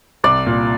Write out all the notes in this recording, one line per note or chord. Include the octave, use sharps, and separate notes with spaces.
C2 D5
A#2